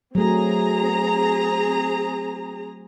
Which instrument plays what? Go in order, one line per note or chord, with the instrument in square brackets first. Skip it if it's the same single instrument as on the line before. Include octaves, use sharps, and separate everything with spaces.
[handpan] F#3 A3 [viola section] C4 G#4 A#5